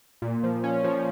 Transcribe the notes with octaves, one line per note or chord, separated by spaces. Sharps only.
A#2
F3
C#4
F3